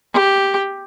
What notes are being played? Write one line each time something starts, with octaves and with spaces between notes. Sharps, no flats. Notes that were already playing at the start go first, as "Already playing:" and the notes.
G4